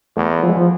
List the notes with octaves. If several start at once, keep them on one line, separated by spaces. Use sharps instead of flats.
E2 A3
F3
G#3
F3